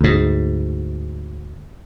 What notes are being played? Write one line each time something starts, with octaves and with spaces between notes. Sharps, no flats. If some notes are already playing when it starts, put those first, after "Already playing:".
D2 G#2